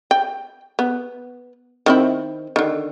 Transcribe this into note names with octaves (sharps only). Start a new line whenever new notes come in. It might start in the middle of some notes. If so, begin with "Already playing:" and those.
G5
B3
D#3 C4 E4
D3 D#3